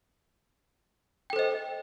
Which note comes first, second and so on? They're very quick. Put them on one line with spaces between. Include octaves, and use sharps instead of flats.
G5 A4 C5 D#5